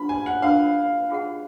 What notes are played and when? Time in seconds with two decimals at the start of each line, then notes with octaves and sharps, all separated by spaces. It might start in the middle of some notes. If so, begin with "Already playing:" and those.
Already playing: D4 F4 B5
0.09 G#5
0.26 F#5
0.42 D4 F4 A#4 D#5 F5
1.10 F4 G#4 D#5 F#5